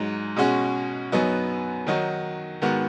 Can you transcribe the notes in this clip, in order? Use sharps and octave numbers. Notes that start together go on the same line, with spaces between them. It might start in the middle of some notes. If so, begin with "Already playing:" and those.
Already playing: G#2 F#3 D#4
B2 G#3 C#4 F#4
F#2 F#3 B3 D#4 F#4
D#3 F#3 D#4 F#4
G#2 D#3 B3 F#4